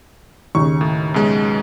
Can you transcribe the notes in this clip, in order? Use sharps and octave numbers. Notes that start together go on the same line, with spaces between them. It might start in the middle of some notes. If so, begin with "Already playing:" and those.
D#2 C#3 C#6
A2
F#2 B2 G#3